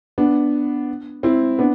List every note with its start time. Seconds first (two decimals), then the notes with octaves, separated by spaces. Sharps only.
0.18 B3 D4
1.23 C4 E4
1.59 B3 D4